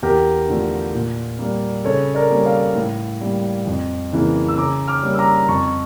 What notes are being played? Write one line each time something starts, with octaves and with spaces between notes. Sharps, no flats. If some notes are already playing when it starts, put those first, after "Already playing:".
E2 G4 A#4
D3 F3 A3
A#2
G3 A#3
C#3 A4 C#5
A#4 D5
G3 A#3 C#4
D5 F5
A2
G3 A#3
F2
C#3 E3 A#3
E6
C#3 A#5 D6
D6 F6
G3 A#3 C#4
E6
A#5 D6
F2 A5 C#6